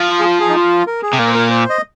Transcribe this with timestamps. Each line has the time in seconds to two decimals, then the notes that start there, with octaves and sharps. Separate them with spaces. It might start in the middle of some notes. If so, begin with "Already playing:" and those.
Already playing: F3
0.09 F4
0.19 G#4
0.24 F4
0.40 G#4
0.49 D#4
0.56 F4
0.87 A#4
1.02 G#4
1.13 C3
1.19 A#2 A#4
1.27 C5
1.34 A#4
1.50 C5
1.70 D#5